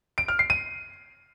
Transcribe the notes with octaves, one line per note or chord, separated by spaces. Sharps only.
D7
F6
C7
D#7